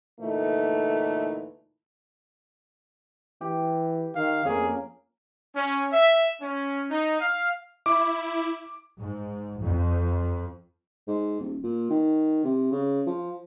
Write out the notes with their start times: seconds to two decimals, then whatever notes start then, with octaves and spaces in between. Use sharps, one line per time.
0.20 D2 A#2 E3 A3 D#4
3.41 E3 G4
4.16 D#3 F5
4.45 F2 A#3 C#4 G#4
5.56 C#4
5.92 E5
6.41 C#4
6.90 D#4
7.20 F5
7.86 E4 D6
8.99 G#2
9.60 F2
11.08 G#2
11.40 D#1
11.63 A#2
11.90 D#3
12.44 C3
12.72 C#3
13.06 F3